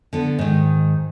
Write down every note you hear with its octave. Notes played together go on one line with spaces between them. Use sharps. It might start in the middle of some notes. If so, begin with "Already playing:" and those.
D3 B3
G#2 D#3